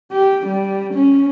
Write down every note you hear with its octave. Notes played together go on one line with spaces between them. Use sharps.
G4
G3
C#4